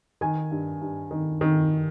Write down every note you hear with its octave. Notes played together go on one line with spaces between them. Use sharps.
D#3 G#5
G2
G2
D#3
D#3